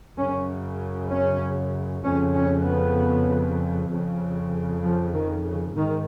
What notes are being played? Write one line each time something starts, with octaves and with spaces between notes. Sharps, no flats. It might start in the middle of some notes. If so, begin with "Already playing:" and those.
F#2 C#3 C#4
C#4
F2 C#3 C#4
C#4
B3
F2 C#3
F3
D#3
C#3
G#2 D#3